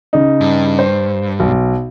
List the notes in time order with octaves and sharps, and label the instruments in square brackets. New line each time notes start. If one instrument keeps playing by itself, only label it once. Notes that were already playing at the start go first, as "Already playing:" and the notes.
[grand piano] C#3 D#4
[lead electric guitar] G2
[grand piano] C5
B1